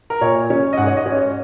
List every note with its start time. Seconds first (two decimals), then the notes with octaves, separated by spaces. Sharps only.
0.10 A#4
0.21 A#2 C#5
0.50 C#4
0.73 D#5
0.77 G#2 F#5
0.87 C#5
0.97 D#5
1.06 C#4
1.16 C#5